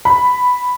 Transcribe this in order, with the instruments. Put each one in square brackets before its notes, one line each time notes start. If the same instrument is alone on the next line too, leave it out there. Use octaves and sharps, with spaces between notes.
[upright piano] B5